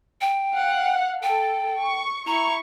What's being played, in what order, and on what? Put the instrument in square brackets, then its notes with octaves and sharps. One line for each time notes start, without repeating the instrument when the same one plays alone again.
[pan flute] G5
[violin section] F5 F#5
[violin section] A4 [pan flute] G5
[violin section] C#6
[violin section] E4 C#6 [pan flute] A#5